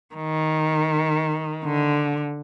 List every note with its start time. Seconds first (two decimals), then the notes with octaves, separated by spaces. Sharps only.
0.15 D#3
1.65 D3